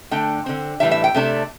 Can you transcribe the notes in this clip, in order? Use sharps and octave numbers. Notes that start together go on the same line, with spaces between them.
D3 A3 D4 G5
D3 C4
A2 E3 G3 D4 E5
E5
G5
C3 A3 D4